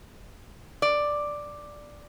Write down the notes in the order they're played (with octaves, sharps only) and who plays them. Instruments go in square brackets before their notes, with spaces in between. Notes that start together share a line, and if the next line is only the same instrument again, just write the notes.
[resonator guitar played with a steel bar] D5